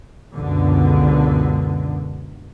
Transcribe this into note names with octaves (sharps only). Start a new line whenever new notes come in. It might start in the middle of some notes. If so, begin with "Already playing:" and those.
C#2 F#2 B2 D3